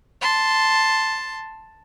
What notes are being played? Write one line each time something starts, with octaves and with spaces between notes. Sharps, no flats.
A5 C6